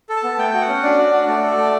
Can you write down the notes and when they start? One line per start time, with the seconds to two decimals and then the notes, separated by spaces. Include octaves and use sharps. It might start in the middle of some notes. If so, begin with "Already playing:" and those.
0.09 A4
0.16 A5
0.23 B3
0.38 A3 G5
0.54 F#4
0.61 F#5
0.68 C#4
0.83 D4 D5
0.98 F#4
1.13 F#4
1.28 A3 D5
1.42 A4
1.57 A3